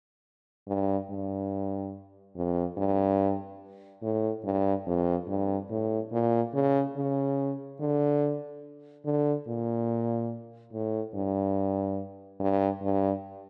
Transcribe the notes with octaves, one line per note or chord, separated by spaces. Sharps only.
G2
G2
F2
G2
A2
G2
F2
G2
A2
A#2
C#3
C#3
D3
D3
A#2
A2
G2
G2
G2